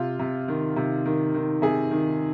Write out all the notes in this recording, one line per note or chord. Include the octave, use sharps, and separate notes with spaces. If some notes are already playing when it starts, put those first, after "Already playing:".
Already playing: C3 F4
C3
D#3
C3
D#3
D#3
C3 G#4
D#3